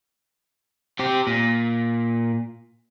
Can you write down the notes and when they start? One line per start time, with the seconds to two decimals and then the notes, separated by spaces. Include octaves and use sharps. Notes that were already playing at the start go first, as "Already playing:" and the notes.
0.99 C4 G4
1.27 A#2